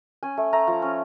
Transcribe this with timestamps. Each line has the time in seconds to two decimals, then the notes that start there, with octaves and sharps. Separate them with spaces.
0.23 C#4 G#5
0.37 A3
0.53 A3 A#5
0.67 F3
0.82 C#4